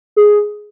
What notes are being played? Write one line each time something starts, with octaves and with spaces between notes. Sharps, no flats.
G#4